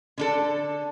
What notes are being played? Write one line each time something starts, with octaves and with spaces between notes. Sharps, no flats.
D3 D4 A4